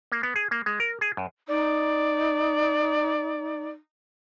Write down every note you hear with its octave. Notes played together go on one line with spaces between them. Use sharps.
A#3
B3
G#4
A#3
G#3
A#4
G#4
F#2
D#4 D5